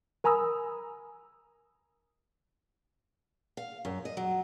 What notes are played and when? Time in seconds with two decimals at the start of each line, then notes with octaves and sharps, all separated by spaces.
0.24 A#4 G#5 A#5 B5 D#6 E6
3.57 F5
3.85 F#2
4.05 D#5
4.17 F#3